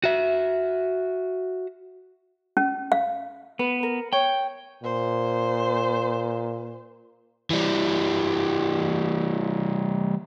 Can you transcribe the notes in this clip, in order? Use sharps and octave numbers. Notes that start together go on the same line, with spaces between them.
F#4 E5
C#4
F5
B3 B4
A#4
C#5 G5
A#2 C5
E3 G3